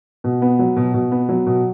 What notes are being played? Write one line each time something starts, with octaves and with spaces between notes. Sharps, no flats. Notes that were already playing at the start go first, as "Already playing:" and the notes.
B2
B3
F#3
B2
B2
B3
F#3
B2